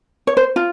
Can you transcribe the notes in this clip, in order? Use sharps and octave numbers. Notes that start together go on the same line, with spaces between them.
C#5
C5
F4